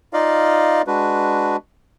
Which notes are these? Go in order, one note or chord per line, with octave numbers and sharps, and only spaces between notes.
D#4 F4 D5 D#5 F5
G#3 D4 F#4 B4